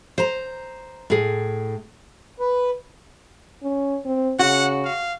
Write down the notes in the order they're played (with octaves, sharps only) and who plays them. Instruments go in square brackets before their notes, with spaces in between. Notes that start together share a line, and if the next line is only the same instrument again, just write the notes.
[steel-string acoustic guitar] C5 A#5
A2 G#4
[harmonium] B4
[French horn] C#4
C4
[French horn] C#3 [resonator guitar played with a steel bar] F#4 [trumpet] F#5
[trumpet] F5